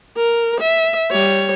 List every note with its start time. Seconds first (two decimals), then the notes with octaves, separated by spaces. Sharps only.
0.17 A#4
0.61 E5
1.12 G3 C#5